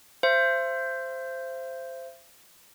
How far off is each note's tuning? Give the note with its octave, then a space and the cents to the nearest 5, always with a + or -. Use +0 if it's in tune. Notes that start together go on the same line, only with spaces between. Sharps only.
C5 +0 E5 +40